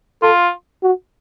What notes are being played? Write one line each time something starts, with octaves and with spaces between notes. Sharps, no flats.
F4 A4
F#4